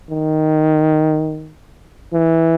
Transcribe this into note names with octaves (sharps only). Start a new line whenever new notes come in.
D#3
E3